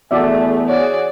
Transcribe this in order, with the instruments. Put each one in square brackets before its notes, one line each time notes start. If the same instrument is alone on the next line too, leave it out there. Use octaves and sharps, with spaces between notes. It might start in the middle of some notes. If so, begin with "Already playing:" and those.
[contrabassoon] E2 [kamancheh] A3 G#4 [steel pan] F#4 D5 E5
[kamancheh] F#4 G#4 [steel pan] C#5 [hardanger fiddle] D5